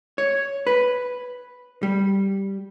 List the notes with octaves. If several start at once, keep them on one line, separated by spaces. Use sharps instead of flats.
C#5
B4
G3